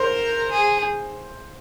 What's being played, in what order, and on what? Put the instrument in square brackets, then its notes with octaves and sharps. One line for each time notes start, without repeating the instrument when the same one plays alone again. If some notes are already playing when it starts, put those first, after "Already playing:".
Already playing: [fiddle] A#4 [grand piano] C5
[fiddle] G#4